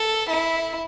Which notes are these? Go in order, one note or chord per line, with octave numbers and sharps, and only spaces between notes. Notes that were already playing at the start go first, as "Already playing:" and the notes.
Already playing: A4
E4